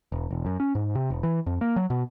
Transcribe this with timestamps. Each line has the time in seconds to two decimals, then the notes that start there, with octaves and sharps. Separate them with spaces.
0.12 E1
0.31 E1
0.46 F#2
0.60 C#4
0.75 G#2
0.95 C3
1.10 E1
1.23 E3
1.46 F2
1.61 A#3
1.76 F#3
1.90 B2